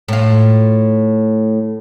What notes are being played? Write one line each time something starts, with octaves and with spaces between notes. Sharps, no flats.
A2 F4